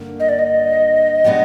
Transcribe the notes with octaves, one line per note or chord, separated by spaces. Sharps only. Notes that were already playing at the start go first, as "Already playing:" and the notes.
Already playing: G2 D3 A#3
D#5
D5
D#5
B2 G#3 B3 D4 G4